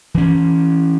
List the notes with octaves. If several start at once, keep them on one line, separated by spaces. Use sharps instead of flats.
E3 C#4